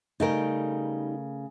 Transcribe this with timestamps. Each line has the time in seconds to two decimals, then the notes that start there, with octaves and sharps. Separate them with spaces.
0.20 C#3 G3 A3 D#4 A#4